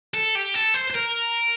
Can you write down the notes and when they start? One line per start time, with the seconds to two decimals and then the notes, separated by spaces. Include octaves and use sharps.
0.14 A4
0.35 G4
0.54 A4
0.75 C5
0.90 C5
0.95 A#4